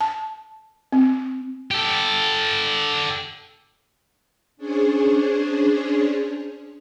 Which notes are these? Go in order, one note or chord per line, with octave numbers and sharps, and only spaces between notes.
A5
C4
G4 A4
C#4 D4 G#4 C5 C#5